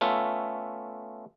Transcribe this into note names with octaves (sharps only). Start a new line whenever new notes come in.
A3 B3 C#4 F4 E5